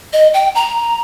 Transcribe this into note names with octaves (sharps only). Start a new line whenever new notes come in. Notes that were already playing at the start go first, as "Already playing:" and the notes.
D#5
G5
A#5